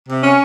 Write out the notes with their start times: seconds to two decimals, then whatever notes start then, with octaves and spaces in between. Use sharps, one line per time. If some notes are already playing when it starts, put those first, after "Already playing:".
0.09 C3
0.23 C#4